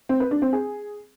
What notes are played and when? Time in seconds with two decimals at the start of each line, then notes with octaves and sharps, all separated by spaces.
0.09 C4
0.20 B4
0.31 D4
0.42 C4
0.53 G#4